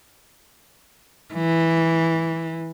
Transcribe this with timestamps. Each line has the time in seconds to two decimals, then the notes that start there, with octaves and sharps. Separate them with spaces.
1.34 E3